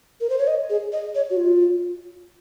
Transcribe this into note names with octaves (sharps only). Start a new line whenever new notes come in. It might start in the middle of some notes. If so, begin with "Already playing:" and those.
A#4
C5
C#5
D#5
G#4
D#5
C#5
F#4
F4